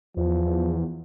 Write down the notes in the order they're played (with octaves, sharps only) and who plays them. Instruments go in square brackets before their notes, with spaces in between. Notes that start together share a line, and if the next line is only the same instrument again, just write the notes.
[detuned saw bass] E2 [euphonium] F3